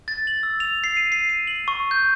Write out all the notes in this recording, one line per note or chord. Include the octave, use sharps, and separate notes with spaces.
A6
F#7
E6
F7
C7
D#7
C7
D#7
F#7
C#6
G6